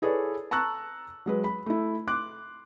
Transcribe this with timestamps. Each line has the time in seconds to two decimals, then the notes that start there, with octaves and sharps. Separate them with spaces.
0.02 E4 G#4 A4 B4 C#5 D5
0.51 A5 A#5 C#6 E6 F#6
1.26 F#3 G#3 B4
1.44 B5
1.66 A3 E4
2.07 C6 D6 F#6